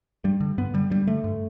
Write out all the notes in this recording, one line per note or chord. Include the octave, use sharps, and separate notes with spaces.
G2 G3
D3
G2 B3
D3 G3
G2 G3
D3 A3
G2